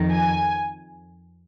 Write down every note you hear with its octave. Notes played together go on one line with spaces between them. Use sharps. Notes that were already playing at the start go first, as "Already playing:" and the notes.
Already playing: F2 D#3
G#5